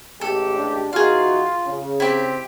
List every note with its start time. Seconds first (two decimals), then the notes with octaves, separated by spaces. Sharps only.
0.21 A1 G#3 G4 A4
0.55 D4
0.93 E3 D#4 F4 F#4 G#4 F5
1.65 C#3
2.00 C4 E4 G4